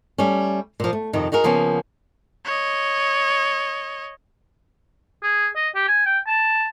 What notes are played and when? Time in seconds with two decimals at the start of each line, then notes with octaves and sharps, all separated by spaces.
0.18 G3 A3 C#4
0.80 A#2 F3
0.93 A3
1.13 F2 C3 D#3 D#4
1.32 D#4 F#4 G#4 A#4
1.44 C#3 F3 A#3 B3 C#4
2.45 C#5 D#5
5.23 G#4
5.56 D#5
5.75 G4
5.88 G#5
6.06 G5
6.28 A5